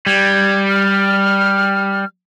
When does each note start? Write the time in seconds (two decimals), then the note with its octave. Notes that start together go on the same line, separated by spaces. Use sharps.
0.07 G3 G#6
0.69 F6